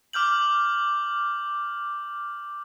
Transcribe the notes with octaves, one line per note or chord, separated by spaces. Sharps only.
D6 F6 G6 F#7